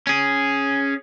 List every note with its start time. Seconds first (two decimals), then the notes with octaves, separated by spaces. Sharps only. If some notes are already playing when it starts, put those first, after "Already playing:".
0.07 C#4 G#4